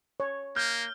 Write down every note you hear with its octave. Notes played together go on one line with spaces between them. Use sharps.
C#5
A#3 F6 G6